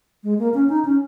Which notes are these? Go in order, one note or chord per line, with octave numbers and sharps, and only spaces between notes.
G#3
A#3
C#4
D#4
C#4